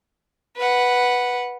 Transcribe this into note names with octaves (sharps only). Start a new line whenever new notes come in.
B4 F#5